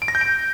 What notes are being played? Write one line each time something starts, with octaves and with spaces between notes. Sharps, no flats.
D7
A#6
G6
D7